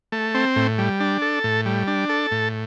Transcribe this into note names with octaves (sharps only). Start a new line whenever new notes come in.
A3
C4
A2
G3
D4
A4
A2
G3
D4
A4
A2